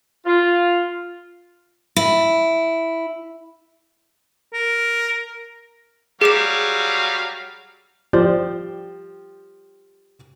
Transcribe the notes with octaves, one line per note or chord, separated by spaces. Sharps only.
F4
E4
A#4
F#3 G3 G#4 F5 D6 E7
F3 G4 C5 D5